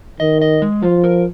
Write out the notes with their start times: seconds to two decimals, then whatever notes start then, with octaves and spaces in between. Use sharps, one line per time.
0.20 D#3 D#5
0.42 D#5
0.62 G#3
0.83 F3 F4
1.04 A#4